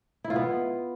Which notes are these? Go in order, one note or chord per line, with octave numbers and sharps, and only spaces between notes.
E4
F4
B3